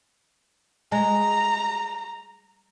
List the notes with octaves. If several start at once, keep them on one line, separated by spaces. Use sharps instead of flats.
G#3 A#5